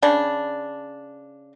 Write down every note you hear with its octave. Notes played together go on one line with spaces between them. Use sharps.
C#3 D4